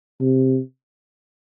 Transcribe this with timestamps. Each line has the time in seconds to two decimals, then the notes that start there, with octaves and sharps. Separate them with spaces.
0.20 C3